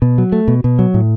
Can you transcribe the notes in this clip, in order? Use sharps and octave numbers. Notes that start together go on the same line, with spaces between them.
B2
F#3
A3
B2
B2
F#3
A2